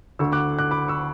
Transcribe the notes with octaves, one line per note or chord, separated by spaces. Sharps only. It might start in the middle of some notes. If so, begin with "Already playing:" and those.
D2 D3 C#6 E6
D6 F#6
D6 F#6
B5 D6
C#6 E6